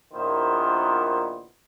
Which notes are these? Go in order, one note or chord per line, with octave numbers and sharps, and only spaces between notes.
A#1 A#2 D#3 B3 E4 C5